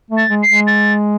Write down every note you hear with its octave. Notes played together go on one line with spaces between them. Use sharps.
A3
A6
G#3
C7
G#3
A6